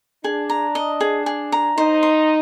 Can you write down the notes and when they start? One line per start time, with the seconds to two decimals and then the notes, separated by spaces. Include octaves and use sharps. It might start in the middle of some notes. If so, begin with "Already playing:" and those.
0.24 D4 G#4
0.50 A#5
0.75 D#5
1.01 G#4
1.26 G#4
1.52 A#5
1.77 D#4 C5
2.03 C6